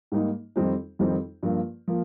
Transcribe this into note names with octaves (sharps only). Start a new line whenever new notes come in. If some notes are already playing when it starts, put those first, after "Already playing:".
G#2 G3 A#3 D#4
F2 D#3 G3 C4 D#4
F2 D#3 G3 C4 D#4
G2 F3 A#3
F3 A#3